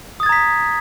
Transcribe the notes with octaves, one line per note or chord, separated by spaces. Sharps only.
A#5 D#6 G#6 A6 B6